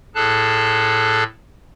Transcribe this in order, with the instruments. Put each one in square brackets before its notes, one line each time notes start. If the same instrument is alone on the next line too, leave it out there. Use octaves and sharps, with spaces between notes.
[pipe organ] A2 G#4 A4 A5 F#6